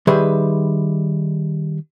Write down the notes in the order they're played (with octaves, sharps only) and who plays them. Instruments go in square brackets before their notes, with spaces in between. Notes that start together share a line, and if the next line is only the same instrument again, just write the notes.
[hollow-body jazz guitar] D#3 G3 G#4 B4 E5 C6